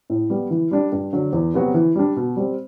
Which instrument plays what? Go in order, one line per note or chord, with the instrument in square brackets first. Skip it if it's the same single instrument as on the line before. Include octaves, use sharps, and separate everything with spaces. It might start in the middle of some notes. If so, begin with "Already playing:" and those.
[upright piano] A2
G3 B3
E3
G3 D4
G2
D3 F#3
E2
C3 F#3 B3 F#4
E3
G3 D4
B2
G3 C4